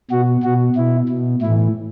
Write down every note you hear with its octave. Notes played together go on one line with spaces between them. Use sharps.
B2 F#4
B2 F#4
B2 E4
B2
A2 E3 E4